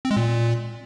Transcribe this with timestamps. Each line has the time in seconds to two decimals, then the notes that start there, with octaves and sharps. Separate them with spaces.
0.05 C4
0.11 G#3
0.16 A#2